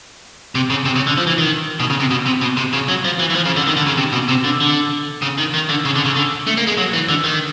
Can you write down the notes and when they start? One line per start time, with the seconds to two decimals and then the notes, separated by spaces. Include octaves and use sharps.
0.55 C3
0.70 C#3
0.85 C3
0.96 C#3
1.07 D3
1.18 F3
1.27 E3
1.38 D#3
1.80 B2
1.90 C#3
2.00 C3
2.11 B2
2.26 C3
2.41 B2
2.57 C3
2.73 C#3
2.89 F#3
3.04 F3
3.19 E3
3.30 E3
3.35 F3
3.45 C#3
3.56 D3
3.67 D#3
3.77 D3
3.87 C#3
3.98 C3
4.13 B2
4.29 C3
4.44 D3
4.60 D3
5.22 C#3
5.38 D#3
5.54 D#3
5.69 D3
5.85 C#3
5.95 D3
6.05 C#3
6.16 D3
6.47 A3
6.57 A#3
6.67 G#3
6.78 F#3
6.93 E3
7.09 D3
7.24 D#3